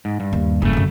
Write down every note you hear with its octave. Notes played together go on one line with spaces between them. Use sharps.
G#2
G2
D#2
F#1 G2 C#3 A3
F#2 D3